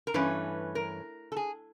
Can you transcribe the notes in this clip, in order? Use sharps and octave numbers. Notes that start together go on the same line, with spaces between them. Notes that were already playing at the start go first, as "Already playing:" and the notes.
A#4
G2 E3 A3 C#4 B4
A#4
A4
G#4